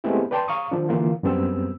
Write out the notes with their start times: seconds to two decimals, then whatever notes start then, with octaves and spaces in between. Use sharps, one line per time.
0.04 G#3 A3 B3 C4 E4 G4
0.31 B4 D5 G5 A5 C6
0.48 F5 A#5 C#6 D#6
0.71 D#3 F3 D4
0.89 D3 E3 A#3 F4
1.23 F#2 G3 B3 C4 E6